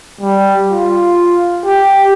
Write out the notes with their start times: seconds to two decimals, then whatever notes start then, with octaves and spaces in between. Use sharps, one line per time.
0.21 G3
0.69 F4
1.66 G4